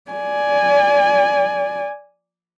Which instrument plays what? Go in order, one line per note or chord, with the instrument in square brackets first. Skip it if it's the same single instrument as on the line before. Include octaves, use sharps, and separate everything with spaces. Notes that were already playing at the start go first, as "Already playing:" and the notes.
[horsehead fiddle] D5 G#5